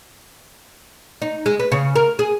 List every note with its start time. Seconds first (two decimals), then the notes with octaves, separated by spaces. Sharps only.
1.22 D#4
1.46 G#3
1.59 B4
1.72 C#3
1.96 A#4
2.19 G#4